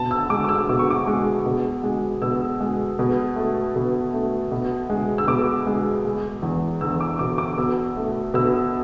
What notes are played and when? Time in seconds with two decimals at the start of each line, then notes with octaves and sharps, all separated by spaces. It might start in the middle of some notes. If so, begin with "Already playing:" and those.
Already playing: B2 A5
0.11 E6
0.30 G#3 D6
0.44 D6
0.49 E6
0.69 B2 D6
0.79 C#6
0.91 D6
1.07 G#3
1.46 B2
1.84 G#3
2.22 B2 E6
2.61 G#3
2.99 B2
3.36 A3
3.76 B2
4.13 A3
4.52 B2
4.90 G#3
5.18 E6
5.28 B2 D6
5.67 G#3
6.05 G#3
6.42 E2
6.81 E2 E6
7.01 D6
7.19 B2 D6
7.38 D6
7.58 B2 E6
7.97 A3
8.34 B2 E6